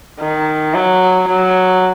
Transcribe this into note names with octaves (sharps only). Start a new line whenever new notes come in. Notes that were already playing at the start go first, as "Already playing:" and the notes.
D#3
F#3
F#3